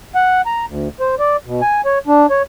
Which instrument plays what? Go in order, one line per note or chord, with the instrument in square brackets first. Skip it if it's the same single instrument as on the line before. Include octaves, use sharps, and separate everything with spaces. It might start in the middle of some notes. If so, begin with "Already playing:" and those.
[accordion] F#5
A#5
D2
C5
D5
B2
G#5
C#5
D4
C#5